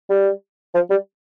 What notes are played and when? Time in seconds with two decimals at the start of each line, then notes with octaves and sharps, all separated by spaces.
0.10 G3
0.74 F3
0.90 G3